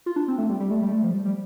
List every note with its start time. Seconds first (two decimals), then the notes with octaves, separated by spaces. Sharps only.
0.06 F4
0.16 D4
0.28 C4
0.38 A3
0.49 G3
0.60 G3
0.71 A3
0.82 G3
0.92 A3
1.04 F3
1.14 G3
1.25 G3